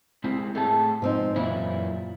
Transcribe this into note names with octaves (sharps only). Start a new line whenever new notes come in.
G#3 C4 E4
A2 A3 G#4 A5
G#2 F3 C4 D#4
F#2 A#2 E3 E4